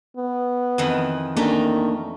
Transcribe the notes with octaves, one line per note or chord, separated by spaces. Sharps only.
B3
F2 D#3 E3
D#3 A3 A#3 C#4 D4 A#4